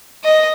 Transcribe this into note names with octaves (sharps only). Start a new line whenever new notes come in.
D#5